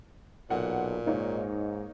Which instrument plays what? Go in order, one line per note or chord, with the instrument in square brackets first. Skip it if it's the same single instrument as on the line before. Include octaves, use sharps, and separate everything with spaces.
[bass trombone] B1 [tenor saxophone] A#2 [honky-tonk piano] F#5
[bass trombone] G#2 [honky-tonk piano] A#3 D#4 C#5